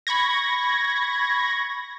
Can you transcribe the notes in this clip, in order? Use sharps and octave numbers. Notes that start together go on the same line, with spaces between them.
B5 C#6 G#6 A#6